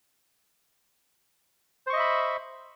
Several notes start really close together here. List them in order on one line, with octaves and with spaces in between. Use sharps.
C5 C#6 D#5 E5 B5